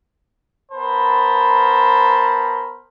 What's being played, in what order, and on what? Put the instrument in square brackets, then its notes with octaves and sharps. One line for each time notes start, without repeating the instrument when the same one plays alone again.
[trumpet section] B3 A#4 C5 A5 B5